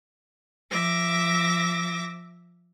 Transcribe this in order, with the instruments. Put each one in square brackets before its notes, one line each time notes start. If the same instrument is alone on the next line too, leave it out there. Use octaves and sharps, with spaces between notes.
[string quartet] F3 E5 D6 A#6